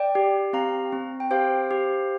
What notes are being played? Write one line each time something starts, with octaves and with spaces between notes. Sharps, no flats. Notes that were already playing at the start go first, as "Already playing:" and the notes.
Already playing: D5 G5
G4
C4 F5 A#5
C4
G5
G4 C5 F5
G4